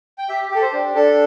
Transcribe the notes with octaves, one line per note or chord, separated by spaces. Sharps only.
G5
G4 E5
G4 A4
C5
D4
D4 A4